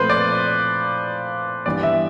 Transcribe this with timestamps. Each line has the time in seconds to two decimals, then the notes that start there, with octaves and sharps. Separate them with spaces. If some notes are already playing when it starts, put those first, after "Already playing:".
Already playing: A#2 F3 A3 C4 B4 C5
0.10 D5
1.66 G2 E3 G3 B3 D5
1.83 E5